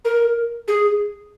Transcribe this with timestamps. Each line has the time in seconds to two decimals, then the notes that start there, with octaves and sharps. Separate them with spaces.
0.05 A#4
0.68 G#4